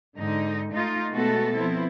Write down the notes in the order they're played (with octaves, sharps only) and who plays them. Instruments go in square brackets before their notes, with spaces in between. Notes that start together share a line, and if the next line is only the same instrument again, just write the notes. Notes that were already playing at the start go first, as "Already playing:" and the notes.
[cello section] G#2 D3 D#4
A3 D#4 F4
B2 G#3 A3 B3 F#4 A4
F3 B3 C4 E4